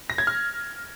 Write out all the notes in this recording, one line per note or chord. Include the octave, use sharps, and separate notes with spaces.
A#6
G#6
F6